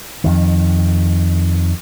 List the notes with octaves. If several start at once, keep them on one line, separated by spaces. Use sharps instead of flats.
F2 D#3